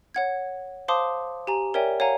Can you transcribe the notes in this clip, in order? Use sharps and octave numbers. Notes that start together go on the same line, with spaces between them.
C#5 F#5 G#6
C5 F5 A5 C6 D6 D#6
G4 G#5 A#5
A#4 C#5 D5 E5 G5 G#5
C#5 F5 F#5 G#5 A#5